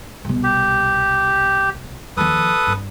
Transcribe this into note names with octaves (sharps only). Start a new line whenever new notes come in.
C2 B2
G4
D#2 F3 A4 B4 D#6
G2